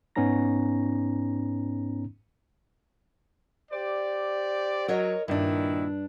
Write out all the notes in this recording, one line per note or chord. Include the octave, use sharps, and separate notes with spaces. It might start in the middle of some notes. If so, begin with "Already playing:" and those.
G#2 B3 C#4 D#4 A#5 A#6
G4 C5 D5
F#3 A#4 C#5 D#5
G2 A#2 D#3 D4 E4